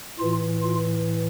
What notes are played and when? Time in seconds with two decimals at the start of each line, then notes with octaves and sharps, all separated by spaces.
0.20 A2 E3 F4
0.63 F4